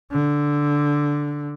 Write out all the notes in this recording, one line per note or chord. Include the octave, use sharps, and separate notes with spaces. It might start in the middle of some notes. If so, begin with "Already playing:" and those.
D3